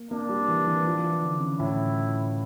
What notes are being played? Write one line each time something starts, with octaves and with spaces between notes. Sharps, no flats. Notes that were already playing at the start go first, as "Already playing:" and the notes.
Already playing: A#3
A#3 D4
G3
E3
E3
F3
E3
D3
C#3
A2 E4